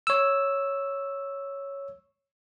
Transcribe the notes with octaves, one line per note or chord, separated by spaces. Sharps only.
C#5 E6